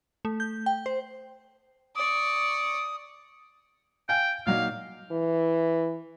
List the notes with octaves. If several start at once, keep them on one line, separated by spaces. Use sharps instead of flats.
A3
G6
G5
C5
D5 C#6 D#6
F5 G5 G#5
A#2 F#3 D#4 F5
E3